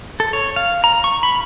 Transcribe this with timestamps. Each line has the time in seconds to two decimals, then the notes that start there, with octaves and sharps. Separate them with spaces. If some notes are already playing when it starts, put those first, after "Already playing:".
0.20 A4
0.33 C#5
0.56 F5
0.84 A#5
1.04 C#6
1.23 B5